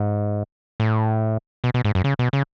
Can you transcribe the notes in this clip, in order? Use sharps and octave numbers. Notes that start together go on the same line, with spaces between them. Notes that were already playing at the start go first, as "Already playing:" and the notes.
Already playing: G#2
A2
B2
B2
G#2
F#2
C#3
B2
C#3